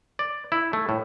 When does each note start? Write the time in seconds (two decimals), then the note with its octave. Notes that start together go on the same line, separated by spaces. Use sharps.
0.19 D5
0.52 E4
0.73 A3
0.89 A2